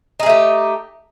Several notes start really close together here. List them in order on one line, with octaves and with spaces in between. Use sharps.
D#4 G#4 A3 G4